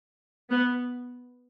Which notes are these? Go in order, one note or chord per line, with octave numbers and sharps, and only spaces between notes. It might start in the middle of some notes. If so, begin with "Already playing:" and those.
B3